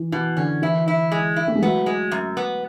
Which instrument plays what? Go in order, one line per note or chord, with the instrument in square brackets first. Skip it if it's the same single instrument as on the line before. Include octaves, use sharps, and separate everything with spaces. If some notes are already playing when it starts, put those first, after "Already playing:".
Already playing: [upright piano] E3
[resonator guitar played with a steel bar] B2 [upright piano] E3
[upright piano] D3 [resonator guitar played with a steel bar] C#4
[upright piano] E3 [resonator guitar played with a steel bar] E4
[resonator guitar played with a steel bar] E4
G#3
E4
[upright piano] A3
G#3
[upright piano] F#3 [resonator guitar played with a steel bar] B3
[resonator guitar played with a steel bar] G#3
F#2
B3